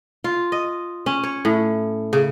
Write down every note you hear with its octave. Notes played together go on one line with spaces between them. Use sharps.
F4
D#5
C#4
C#5
A2
C#3